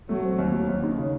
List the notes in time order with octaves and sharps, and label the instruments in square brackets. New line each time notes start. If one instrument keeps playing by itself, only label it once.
[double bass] F#3 [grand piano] A3
[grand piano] C4
D#2
F#3
D#2
D#3
C#3